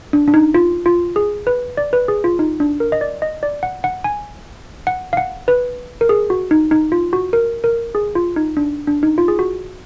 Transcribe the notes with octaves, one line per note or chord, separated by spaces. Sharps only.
D4
D4
D#4
F4
F4
G#4
B4
D5
B4
G#4
F4
D#4
D4
A#4
D#5
D5
D#5
D5
F#5
F#5
G#5
F#5
F5
F#5
B4
A#4
G#4
F#4
D#4
D#4
F4
F#4
A#4
A#4
G#4
F4
D#4
D4
D4
D#4
F4
G#4
F#4